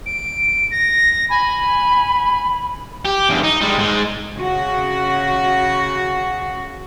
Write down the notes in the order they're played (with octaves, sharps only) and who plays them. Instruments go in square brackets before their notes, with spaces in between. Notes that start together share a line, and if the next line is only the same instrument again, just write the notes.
[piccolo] D7
A#6
[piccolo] G#5 [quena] B5
[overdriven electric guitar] G4
E2 G2
D#4
G3 G#3
G#2 G#3
[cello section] C#3 F#4